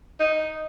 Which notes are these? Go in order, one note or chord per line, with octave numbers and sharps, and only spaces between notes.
D#4